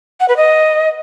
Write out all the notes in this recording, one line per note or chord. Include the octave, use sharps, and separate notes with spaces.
F#5
B4
D#5